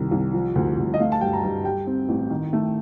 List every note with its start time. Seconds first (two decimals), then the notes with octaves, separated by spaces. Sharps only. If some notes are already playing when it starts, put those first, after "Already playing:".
Already playing: C2 D#3
0.11 C2
0.33 F3
0.55 D2
0.78 D2
0.94 D#5
1.00 A3 F5
1.12 A5
1.21 G2 G5
1.33 A#5
1.43 G2 A5
1.64 G3 G5
1.87 C4
2.09 A1
2.30 D#3
2.53 A3